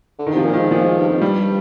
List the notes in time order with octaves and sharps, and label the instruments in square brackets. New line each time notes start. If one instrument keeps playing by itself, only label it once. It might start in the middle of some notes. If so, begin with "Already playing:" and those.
[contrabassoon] D3
[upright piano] D#3
[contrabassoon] C3 [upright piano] F3
[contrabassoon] A#2
[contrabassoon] G#2 [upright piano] D#3
[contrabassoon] A#2 [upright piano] F3
[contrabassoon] G#2
G2
F2
[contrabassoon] G2 [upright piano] G3